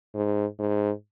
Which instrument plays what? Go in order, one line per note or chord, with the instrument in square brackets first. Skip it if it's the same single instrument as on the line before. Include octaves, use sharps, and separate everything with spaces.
[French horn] G#2
G#2